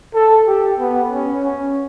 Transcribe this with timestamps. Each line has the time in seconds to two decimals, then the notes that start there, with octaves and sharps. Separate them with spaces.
0.15 A4
0.47 G4
0.80 B3
1.12 C#4
1.44 C#4